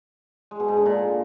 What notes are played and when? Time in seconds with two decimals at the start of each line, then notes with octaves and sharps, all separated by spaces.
0.51 G#3
0.60 B2
0.68 G#2
0.77 D3
0.86 A#2